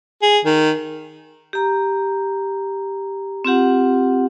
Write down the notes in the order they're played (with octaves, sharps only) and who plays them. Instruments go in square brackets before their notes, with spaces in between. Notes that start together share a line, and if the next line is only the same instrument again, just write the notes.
[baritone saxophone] G#4
D#3
[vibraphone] G4 A#5
C4 F4 G4 F#5